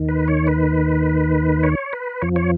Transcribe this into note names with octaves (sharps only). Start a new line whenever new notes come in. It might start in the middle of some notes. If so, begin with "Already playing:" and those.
Already playing: D#2 D#3
B4
C#5
B4
C#5
B4
F2 F3 C#5
C#5